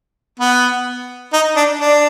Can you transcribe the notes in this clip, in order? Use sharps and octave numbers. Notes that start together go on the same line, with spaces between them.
B3
D#4
D4
D4